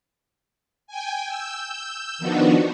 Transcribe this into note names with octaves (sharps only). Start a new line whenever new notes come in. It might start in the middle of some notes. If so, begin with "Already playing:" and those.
G5 G#5
E6 G6
D#3 F3 B3 D4 D#4 F#4